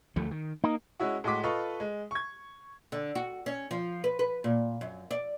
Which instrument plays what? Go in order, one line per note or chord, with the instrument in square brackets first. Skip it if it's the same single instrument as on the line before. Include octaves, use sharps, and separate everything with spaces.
[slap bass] D2 F3 A3
D#3
[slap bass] A#3 [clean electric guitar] D#4
[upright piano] G#3 C#4 E4 F#4
A2 G#3 F#4 C6 D6 B6
F4 A4 B4 D#5 C#6
G#3
C#6 G#6
[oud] D3
F#4
C#4
F3
B4
B4
A#2
F#2
D5